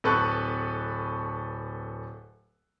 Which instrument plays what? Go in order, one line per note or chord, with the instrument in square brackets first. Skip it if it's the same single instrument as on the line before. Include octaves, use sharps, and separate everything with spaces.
[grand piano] D1 A4 B4 C#6 F#6